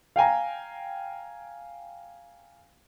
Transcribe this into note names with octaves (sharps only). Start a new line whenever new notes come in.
F5 G5 G#5 A#5